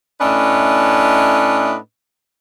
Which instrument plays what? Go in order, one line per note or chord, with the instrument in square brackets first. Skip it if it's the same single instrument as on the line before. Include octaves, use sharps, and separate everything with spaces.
[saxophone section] A2 C#4 D4 B4 D#5 E5